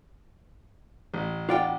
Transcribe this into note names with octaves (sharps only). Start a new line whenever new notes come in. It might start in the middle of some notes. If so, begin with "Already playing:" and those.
A1
B3 D4 F4 D5 F5 G5